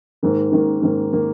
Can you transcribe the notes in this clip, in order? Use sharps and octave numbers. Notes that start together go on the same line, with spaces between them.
G#2 D#3 A#3
G#2 D#3 A#3
G#2 D#3 A#3
D#3 A#3